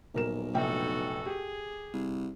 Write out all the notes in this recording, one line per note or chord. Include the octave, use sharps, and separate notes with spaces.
D#1 B1 A#4 E7
F1 A#1 F#4 A4 G5
G4 G#4
C2